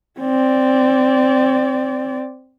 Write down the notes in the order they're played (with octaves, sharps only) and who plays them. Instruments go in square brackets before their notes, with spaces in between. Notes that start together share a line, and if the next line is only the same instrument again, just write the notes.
[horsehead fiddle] C4 D5